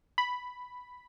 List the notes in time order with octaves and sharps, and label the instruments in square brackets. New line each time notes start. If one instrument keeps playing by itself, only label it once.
[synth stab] B5